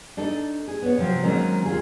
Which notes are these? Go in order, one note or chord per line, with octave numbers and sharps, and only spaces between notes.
D4 D#4 A4
G#4
B3 C#5
C3 F3 F#3
D#3 F#3 G#3 A#3 C4 C#4
D#2 F4 G#4